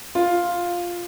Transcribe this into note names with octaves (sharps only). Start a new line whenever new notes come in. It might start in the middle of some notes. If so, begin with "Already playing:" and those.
F4